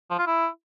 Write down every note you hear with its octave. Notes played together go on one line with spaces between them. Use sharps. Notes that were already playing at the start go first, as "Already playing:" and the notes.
F3
F4
E4